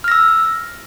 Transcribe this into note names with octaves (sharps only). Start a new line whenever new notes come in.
E6 F6 A#6